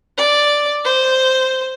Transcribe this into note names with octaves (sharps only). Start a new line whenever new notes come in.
D5
C5